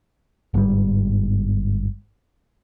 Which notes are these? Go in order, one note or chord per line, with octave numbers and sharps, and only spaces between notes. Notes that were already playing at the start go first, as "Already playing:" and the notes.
G1 G#2 C#3 G3